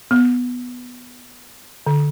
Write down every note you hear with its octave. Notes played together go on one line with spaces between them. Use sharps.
B3
D3